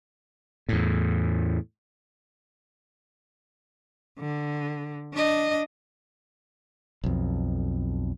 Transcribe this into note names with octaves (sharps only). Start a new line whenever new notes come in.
E2 A2
D3
D4 D#5
B1 F2